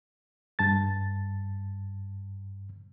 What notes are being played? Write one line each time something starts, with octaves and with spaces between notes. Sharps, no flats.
G2 A5 A6